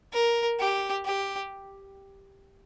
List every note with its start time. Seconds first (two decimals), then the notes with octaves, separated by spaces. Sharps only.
0.12 A#4
0.59 G4
1.05 G4